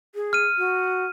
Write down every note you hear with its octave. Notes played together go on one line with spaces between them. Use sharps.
G#4
F6 D#7
F#4